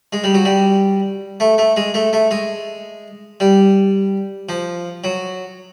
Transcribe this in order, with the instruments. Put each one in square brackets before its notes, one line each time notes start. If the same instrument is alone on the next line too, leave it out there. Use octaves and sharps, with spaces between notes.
[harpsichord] G#3
G3
F#3
G3
A3
A3
G#3
A3
A3
G#3
G3
F3
F#3